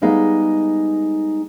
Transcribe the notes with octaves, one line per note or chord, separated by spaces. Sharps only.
G3 G#3 B3 D#4 F5